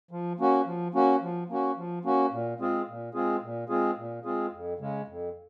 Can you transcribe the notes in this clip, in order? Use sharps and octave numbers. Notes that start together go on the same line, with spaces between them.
F3
A#3 C#4 F#4
F3
A#3 C#4 F#4
F3
A#3 C#4 F#4
F3
A#3 C#4 F#4
A#2
G#3 C4 F4 G#4
A#2
G#3 C4 F4 G#4
A#2
G#3 C4 F4 G#4
A#2
G#3 C4 F4 G#4
F2
C#3 G#3
F2